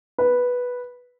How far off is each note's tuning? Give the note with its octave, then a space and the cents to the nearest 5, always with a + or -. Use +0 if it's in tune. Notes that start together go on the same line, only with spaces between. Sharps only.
B4 -5